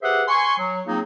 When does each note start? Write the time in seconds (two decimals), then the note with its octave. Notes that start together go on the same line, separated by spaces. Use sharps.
0.03 G4 G#4 B4 C5 E5 F#5
0.28 G#5 C6 C#6
0.58 F#3
0.87 F#3 A#3 C4 D#4 F4 G#4